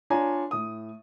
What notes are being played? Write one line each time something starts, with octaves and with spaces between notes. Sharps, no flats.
D4 F4 C#5 D5 G#5 A#5
A2 D#6